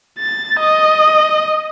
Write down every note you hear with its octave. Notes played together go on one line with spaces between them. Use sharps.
A6
D#5